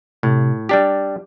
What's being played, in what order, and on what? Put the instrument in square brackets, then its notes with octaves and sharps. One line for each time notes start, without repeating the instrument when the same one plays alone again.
[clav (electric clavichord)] A2 [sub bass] C3
[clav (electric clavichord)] G3 D4 G4